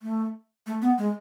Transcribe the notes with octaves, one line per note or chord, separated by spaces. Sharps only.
A3
A3
B3
G#3